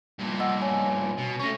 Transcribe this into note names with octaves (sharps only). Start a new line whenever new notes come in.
G2 A#2
D#5 F#5 E6
C#5 G#5
B2
A3 C#4 C#6 A#6